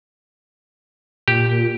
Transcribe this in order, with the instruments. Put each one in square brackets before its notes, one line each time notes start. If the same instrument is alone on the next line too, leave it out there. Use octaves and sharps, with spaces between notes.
[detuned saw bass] A#2 [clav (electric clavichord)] G4